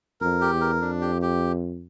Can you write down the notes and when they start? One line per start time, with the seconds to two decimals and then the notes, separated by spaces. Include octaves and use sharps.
0.21 F2 A#4
0.41 G4
0.51 E2
0.61 A#4
0.81 F2 D4
1.01 G4
1.22 G4